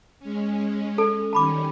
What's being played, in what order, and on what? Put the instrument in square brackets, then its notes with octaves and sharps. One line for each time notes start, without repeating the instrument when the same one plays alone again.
[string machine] G#3 C#4
[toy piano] A4 A5
[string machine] D#3 G3 C#4 [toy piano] A5 B5 D6